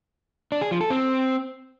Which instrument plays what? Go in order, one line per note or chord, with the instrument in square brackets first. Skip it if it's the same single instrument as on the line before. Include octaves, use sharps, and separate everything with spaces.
[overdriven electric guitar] D4
G#4
F3
A4
C4